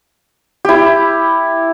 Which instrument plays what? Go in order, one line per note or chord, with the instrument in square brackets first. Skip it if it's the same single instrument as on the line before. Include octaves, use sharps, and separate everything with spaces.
[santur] E4 G4